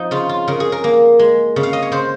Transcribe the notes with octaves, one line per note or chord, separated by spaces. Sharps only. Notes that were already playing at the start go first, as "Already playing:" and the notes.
Already playing: F3 D#4
C#3 F4
F4
C#3 A#4
G#4
A#4
A#3
G#3
C#3
F5
D#5
C#5
C#3 C5